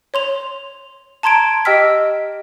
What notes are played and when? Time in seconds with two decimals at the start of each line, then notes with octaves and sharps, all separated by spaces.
0.14 C#5 C6 F7
1.23 A5 A#5 C6 G#6 D7
1.65 G4 D#5 G5 E6 F6 B6